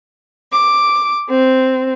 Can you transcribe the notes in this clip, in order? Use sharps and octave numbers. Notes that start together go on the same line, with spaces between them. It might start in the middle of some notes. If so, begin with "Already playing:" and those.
D6
C4